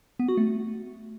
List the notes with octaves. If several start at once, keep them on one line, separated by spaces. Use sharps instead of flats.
B3
F#4
A3